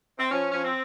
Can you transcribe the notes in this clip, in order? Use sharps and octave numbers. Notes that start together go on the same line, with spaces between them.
C4
F3 C#4
F3 C#4
C4